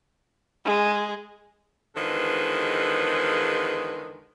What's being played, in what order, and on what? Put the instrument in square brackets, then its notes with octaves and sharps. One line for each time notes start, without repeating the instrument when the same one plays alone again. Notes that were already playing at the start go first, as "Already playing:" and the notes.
[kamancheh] G#3
[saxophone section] E2 D3 D#3 F3 G#3 B4